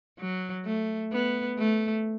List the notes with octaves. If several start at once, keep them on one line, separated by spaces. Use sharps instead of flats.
F#3
A3
B3
A3